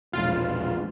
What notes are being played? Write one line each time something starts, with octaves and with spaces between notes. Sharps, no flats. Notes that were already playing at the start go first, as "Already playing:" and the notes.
E1 A#1 G#3 F4